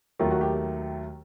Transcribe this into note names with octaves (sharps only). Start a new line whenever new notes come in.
D#2 D#3 F#3 A3 F4
F#4
G4